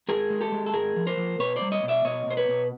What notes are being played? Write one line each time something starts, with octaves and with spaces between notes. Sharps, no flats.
G#2 G#4 A#4
G#3
G4 A4
G#3
A4
G#2 G#4 A#4
F3
A#4 C5
F3
B2 B4 C#5
C5 D5
G3
C#5 D#5
B2
D5 E5
B2 C#5 D#5
B2 C5
B4 C#5
B2